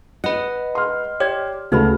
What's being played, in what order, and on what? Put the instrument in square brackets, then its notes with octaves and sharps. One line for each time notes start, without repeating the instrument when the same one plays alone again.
[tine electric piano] B4 F#5 [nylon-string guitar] D#5
[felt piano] C6 F6
[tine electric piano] G4 [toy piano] C#5 D5
[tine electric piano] D2 [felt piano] C#3 A3 [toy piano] D#4 B4 B5 [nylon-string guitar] F#4